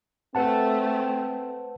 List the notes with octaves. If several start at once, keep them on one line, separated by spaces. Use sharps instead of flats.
A3 C4 B4 F#5 A5